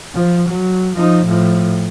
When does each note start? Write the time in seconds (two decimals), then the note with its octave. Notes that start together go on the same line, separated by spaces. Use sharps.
0.15 F3
0.49 F#3
0.97 F3 D#4
1.26 A2 F3